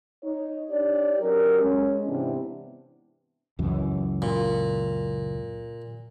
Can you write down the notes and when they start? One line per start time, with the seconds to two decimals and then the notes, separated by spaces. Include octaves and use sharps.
0.23 D#4 C#5
0.70 D4 D#4 G4 C#5 D5
1.20 F#3 C#4 G4 A#4
1.60 G#3 C#4
2.06 G#2 C3 E3 B3 D4 E4
3.59 C#2 F#2 E3
4.22 A#2